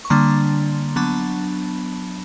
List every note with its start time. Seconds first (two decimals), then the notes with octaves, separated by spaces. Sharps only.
0.05 C#6
0.10 D3 G3 A#3 D4 A#5 C6
0.96 F#3 B3 D4 A5 B5